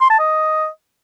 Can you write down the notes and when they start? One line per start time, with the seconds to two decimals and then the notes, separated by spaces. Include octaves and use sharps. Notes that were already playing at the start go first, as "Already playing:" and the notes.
0.01 C6
0.10 A5
0.19 D#5